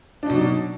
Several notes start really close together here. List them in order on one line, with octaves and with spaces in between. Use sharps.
D4 D#4 B2 F#3